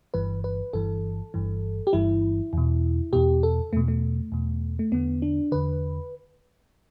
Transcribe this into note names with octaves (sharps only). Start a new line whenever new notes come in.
G1 G2 E3 B4
B4
G1 G2 E3 A4
G1 G2 E3
G4
G1 G2 E3 E4
E2 B2
E2 B2 G4
A4
E2 B2 A3
A3
E2 B2
A3
E2 D3 B3
D4
E2 D3 B4